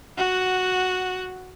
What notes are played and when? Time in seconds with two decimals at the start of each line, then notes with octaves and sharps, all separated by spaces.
0.18 F#4 F#5